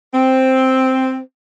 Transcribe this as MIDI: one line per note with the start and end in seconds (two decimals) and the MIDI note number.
0.13 1.19 60